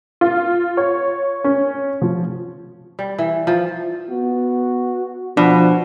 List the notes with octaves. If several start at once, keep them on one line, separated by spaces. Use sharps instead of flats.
F4
C#5
C#4
F3
G3
E3
F3
B3 F#4
B2 F3 D4